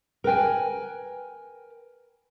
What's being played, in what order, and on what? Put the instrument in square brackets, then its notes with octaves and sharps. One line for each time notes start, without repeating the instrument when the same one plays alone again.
[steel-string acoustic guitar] A#4 B4 G5 G#5